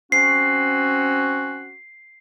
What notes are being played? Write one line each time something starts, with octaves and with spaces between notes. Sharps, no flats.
C4 C#4 F#4 C7